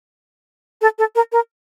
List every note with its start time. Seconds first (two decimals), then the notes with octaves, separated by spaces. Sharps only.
0.82 A4
0.99 A4
1.15 A#4
1.32 A#4